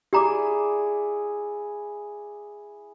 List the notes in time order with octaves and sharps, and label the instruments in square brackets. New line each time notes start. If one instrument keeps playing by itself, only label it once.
[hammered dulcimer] E4 G#4 D5 [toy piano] G4 A#5 D6